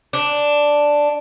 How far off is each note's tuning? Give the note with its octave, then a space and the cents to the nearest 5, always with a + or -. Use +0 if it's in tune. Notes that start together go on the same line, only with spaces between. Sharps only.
D4 +0